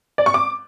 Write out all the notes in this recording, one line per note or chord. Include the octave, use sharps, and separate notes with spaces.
D5
C#6
D6